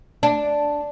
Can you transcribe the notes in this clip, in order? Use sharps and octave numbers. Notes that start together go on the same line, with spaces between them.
D4